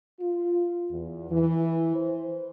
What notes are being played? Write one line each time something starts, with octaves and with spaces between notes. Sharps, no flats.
F4
E2
E3
C5